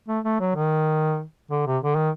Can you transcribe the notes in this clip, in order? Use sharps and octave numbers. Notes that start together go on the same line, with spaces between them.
A3
A3
F#3
D#3
D3
C3
D3
D#3